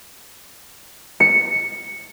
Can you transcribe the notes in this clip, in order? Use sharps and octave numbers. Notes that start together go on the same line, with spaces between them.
C#7